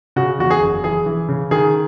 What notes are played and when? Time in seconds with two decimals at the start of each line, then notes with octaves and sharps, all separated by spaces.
0.16 C#3 F#4
0.39 E2 F#4
0.50 G#4
0.61 F#1
0.84 E3 G#4
1.06 E3
1.29 C#3
1.51 D#3 G#4